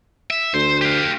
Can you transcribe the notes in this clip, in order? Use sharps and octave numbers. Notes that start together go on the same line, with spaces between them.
E5
D2 C5
G4 F5